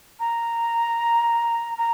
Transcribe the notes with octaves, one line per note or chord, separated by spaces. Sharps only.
A#5
A#5